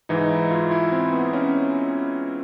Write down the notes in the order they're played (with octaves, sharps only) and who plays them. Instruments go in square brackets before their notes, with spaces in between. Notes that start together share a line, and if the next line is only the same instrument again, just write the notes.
[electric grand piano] G#2 E3 D#4
E4
F4
E4
C4
B3
C#4